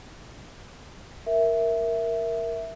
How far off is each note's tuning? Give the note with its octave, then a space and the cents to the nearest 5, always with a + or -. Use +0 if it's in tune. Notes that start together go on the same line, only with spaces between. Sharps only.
A#4 +0 E5 +0